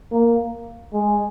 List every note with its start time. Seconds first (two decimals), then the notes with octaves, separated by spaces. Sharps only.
0.12 A#3
0.93 G#3